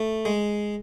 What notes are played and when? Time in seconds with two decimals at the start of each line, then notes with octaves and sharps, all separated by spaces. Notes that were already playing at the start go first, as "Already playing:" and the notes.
Already playing: A3
0.25 G#3